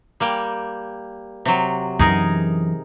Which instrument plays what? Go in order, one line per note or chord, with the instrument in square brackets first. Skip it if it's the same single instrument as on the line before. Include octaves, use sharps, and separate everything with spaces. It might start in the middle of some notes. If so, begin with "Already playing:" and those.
[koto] G3 A#3 G5
C3 F#3
[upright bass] F#2 E3 [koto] D#4 G#4 A#4